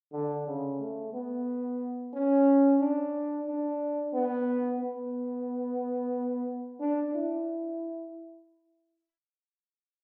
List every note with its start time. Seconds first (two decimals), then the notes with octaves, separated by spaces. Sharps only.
0.13 D3
0.47 C#3
0.80 A3
1.13 B3
2.14 C#4
2.80 D4
3.47 D4
4.13 B3
4.80 B3
6.80 D4
7.14 E4